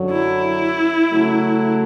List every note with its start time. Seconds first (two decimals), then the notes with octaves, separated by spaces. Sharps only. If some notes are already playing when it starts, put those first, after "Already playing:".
Already playing: F#2 D3 F#3
0.10 E4
1.09 C#3 F#3 A3